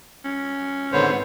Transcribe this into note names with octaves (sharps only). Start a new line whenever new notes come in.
C#4
G#1 G#2 D3 B3 C5 C#5